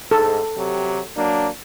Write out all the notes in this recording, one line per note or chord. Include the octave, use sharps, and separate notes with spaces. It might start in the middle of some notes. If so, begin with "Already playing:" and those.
G#2 A4
C3 F#3 G4
F#3 A#3 D4